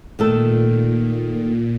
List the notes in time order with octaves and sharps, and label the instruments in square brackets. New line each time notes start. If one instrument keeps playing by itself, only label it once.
[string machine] A#2 [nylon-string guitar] D#3 A3 A4